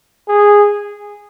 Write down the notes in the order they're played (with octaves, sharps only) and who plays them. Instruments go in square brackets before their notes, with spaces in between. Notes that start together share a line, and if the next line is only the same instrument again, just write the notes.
[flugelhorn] G#4